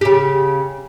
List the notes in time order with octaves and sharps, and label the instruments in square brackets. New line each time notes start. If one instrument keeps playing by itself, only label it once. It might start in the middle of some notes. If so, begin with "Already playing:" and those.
[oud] C#3 G4